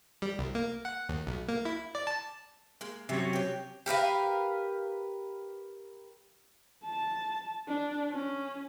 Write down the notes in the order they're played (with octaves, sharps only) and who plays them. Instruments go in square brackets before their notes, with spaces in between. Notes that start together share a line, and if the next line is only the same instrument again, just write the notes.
[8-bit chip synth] G3
C2
A#3
F#5
D#2
B1
A#3
E4
D5
A5
[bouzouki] G#3 A#3
[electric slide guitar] C3 F#3 C#4 [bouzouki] G4 E5
[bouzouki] G4 C#5
G4 A#4 B4 F5
[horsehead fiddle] A5
D4
C#4